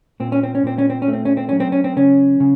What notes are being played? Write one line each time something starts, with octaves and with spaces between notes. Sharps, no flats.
A#2 C4
C#4
C4
C#4
A#2 C4
C#4
C4
C#4
A3
C4
C#4
C4
F#3 C#4
C4
C#4
C4
C#3 C#4
C#3